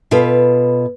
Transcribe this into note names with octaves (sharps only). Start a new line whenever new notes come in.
B2 F4 A4 B4